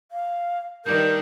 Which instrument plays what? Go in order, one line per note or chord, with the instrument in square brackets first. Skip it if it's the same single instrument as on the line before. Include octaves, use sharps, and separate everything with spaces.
[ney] F5
[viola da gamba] G2 D#3 D4 [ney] A#4 [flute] G6